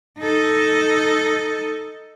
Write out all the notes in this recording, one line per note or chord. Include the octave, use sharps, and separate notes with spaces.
D#4 A4